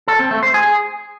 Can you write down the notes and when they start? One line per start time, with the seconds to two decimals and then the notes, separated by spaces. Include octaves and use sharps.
0.08 A4
0.19 C4
0.31 A3
0.43 C5
0.54 G#4